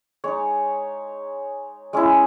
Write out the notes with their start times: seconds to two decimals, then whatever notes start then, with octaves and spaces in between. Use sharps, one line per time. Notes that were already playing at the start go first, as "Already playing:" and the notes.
0.24 G#3 D#4 C#5
1.93 G#3 C#4 E4